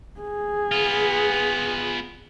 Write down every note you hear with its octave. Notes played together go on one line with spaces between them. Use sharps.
G#4
B3 F4